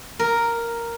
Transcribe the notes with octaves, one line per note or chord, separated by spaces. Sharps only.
A#4